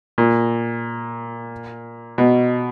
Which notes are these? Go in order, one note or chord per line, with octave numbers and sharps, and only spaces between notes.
A#2
B2